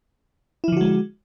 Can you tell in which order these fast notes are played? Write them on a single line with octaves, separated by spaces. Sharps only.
E4 F3 D3 F#4 G#3